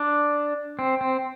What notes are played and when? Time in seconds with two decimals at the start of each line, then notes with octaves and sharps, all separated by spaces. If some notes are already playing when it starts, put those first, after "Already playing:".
Already playing: D4
0.79 C4
1.01 C4